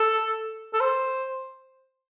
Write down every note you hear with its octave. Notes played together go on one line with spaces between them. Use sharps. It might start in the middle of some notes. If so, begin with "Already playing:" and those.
Already playing: A4
A4
C5